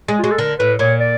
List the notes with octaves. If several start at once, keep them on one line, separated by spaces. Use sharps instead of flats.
G#3
F4
G#3 F#4
A4
D3 A#4
A2 B4
A#2 C#5
D5